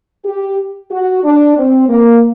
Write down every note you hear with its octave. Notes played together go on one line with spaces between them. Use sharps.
G4
F#4
D4
C4
A#3